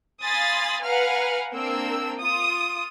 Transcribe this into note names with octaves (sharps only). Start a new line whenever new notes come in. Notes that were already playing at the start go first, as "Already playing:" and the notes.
F5 G#5 B5 C6 D#6 A6
B4 F5 F#5 G#5 A#5 F6
A#3 C4 D4 A#4 G5 E6
F4 D#6